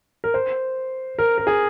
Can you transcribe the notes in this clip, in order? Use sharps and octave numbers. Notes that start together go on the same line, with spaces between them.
A#4
C5
A#4
A#4
G#4